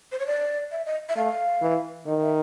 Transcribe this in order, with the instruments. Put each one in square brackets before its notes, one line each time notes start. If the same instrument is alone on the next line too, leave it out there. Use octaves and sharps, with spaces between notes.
[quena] C5
C#5
D5
E5
D#5
E5
[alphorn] A3 [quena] F5
[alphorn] E3
[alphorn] D#3 [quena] D#5
[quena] E5